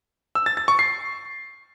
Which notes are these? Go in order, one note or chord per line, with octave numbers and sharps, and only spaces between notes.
E6
A6
A6
C#6
C7